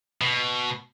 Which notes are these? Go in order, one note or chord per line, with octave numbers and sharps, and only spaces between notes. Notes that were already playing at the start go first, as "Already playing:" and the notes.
B2